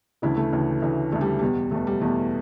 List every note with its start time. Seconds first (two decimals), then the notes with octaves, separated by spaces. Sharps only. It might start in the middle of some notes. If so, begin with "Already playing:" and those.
0.22 D2 C#3 E3 E4
0.37 A3
0.53 D2 C#3 E3
0.82 D2 C#3 E3
1.12 D2 C#3 E3 A3
1.21 G3
1.39 E2 B2 G3
1.71 E2 B2 A3
1.87 G3
2.01 E2 B2 A3